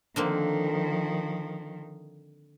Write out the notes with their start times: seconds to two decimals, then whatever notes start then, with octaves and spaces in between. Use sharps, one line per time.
0.16 D3 D#3 F3 A#3 C4